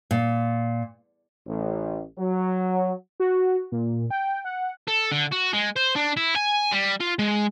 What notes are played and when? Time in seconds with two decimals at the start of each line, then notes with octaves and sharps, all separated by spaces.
0.11 A#2
1.46 A1
2.17 F#3
3.20 F#4
3.72 A#2
4.10 G5
4.45 F#5
4.88 A4
5.11 D3
5.32 F#4
5.53 G#3
5.76 C5
5.96 D4
6.17 E4
6.36 G#5
6.72 G3
7.01 F4
7.19 G#3